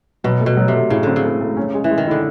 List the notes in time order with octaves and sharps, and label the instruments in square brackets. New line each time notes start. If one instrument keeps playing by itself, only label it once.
[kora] B2 [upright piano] F#3
[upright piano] A3
[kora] B2
[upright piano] F#3
[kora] C3
[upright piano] A3
[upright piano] A2 [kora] C#3
[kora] D3 [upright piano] C4
[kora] C#3
[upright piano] A3
A3
C#4
G#3
[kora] E3
[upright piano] G#3
[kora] D#3
[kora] D3 [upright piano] E4